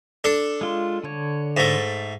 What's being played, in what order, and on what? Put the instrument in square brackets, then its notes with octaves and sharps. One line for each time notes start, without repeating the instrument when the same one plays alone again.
[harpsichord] D4 A4
[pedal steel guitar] G#3 F4
D3 C#5
[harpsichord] G#2 A3